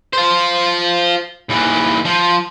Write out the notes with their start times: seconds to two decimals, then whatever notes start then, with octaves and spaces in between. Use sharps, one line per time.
0.13 F4 C5
1.49 D#2 E3
2.06 F3